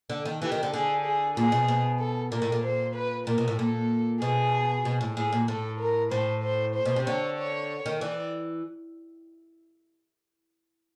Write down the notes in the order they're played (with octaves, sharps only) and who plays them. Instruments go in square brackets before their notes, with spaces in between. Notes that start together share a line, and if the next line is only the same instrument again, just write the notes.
[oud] D3
D#3
[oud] E3 [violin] G4
[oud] D#3
D3
[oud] D3 [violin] G#4
[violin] G#4
[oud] A#2 [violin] G#4
[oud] B2
B2
[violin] A4
[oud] A#2 [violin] A#4
[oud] A2
A#2
[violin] C5
B4
[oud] A#2 [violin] A#4
[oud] B2
A2
[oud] A#2 [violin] A4
[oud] B2 [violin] G#4
[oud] B2
A2
[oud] A2 [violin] G#4
[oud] A#2
[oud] A2 [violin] A4
[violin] A#4
[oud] A2 [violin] C5
[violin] C5
C5
[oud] B2
C3
[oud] D3 [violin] C#5
[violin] C#5
[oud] D#3
[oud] E3 [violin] D5